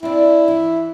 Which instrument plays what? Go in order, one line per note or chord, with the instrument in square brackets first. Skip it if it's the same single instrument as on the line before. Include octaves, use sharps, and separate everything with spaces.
[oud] C4 D4 [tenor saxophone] E4
[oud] E3